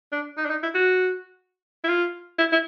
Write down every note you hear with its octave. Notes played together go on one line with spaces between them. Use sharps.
D4
D#4
D4
D#4
E4
F#4
E4
F4
E4
E4